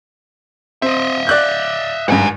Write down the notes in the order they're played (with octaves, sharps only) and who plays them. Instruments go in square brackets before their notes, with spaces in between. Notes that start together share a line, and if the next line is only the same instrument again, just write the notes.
[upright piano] C4 [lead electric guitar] D#5 E5
[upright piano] D5 F#6 G6
[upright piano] G#1 G2 [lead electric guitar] F#5 G#5